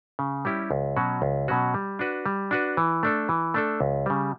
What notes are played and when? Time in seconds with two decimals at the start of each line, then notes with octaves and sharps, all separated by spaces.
0.19 C#3
0.45 G3 C#4 E4 G4
0.71 C#2
0.97 B2 F#3 C#4 F#4
1.22 C#2
1.48 B2 F#3 C#4 F#4
1.74 G3
1.99 D4 F#4 B4
2.26 G3
2.51 D4 F#4 B4
2.77 E3
3.03 A3 D4 A4
3.29 E3
3.54 A3 D4 A4
3.81 C#2
4.06 C#3 G3